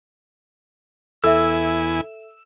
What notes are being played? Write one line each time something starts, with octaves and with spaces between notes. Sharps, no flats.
E2 E4 A4 E5 G#5 E6